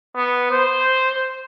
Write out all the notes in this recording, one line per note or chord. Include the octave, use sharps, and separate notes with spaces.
B3
C5